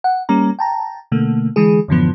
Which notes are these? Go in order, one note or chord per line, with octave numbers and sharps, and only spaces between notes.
F#5
G3 A#3 C#4 A#5
G5 A5 A#5
B2 D3 A3 A#3
D3 E3 G#3 G#4
F#2 A2 D3 E3 F3 B3